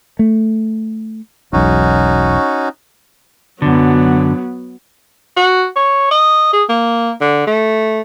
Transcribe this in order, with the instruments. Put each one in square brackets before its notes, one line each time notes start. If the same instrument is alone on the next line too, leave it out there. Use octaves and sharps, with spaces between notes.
[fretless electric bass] A3
[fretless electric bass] E1 B1 [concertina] C#4 D#4 F#4
[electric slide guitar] F#2 D3 [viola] F#3 B3
[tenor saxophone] F#4
C#5
D#5
G#4
A#3
D3
A3